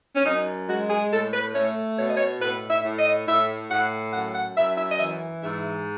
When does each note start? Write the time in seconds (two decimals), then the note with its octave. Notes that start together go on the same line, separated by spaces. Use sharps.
0.15 C#4
0.25 F#2 D#4
0.69 G#3 F#4
0.90 G#4
1.11 A2 A4
1.33 B4
1.54 A3 C#5
1.97 B2 C#5
2.08 D#5
2.17 C#5
2.41 A2 B4
2.70 E5
2.84 A2
2.98 D#5
3.27 A2 E5
3.70 A2 F#5
4.13 F#2 F#5
4.35 F#5
4.57 F#2 E5
4.78 E5
4.91 D#5
4.99 E3 E5
5.42 G#2 E5